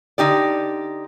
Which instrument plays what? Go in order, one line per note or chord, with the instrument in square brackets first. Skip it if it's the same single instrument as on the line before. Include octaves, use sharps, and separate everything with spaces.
[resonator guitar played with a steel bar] D3 D#4 G4 D5